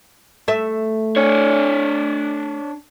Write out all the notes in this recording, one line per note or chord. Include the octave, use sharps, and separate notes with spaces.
A3 E5
D4 C#5